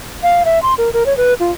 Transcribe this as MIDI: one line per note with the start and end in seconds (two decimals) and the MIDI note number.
0.23 0.43 77
0.45 0.61 76
0.62 0.74 84
0.78 0.90 70
0.93 1.06 70
1.06 1.15 73
1.17 1.34 71
1.40 1.51 65